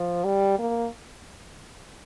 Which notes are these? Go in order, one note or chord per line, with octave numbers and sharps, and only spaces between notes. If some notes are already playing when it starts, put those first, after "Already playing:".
Already playing: F3
G3
A#3